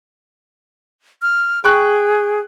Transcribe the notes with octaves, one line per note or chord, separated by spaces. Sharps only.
F6
G#4 G5 C#6 F#6